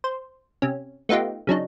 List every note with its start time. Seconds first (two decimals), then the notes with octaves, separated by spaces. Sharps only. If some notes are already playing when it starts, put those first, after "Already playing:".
0.04 C5
0.62 C3 C#4
1.09 A3 B3 D#4 F4 G4
1.47 C#3 F#3 D4 D#4